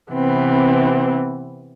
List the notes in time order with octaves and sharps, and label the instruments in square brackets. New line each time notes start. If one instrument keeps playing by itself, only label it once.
[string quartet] C3 E3 B3 C4